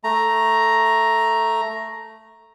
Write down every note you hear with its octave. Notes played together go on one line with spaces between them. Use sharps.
A3 A#5